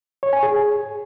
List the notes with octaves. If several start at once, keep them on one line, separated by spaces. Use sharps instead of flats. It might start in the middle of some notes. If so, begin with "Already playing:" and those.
C#5
G#5
G#4